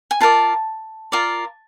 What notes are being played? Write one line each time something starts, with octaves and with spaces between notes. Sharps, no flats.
G#5
F4 A#4 D5 A5
F4 A#4 D5